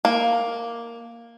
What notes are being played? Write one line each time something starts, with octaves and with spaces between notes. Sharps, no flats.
A#3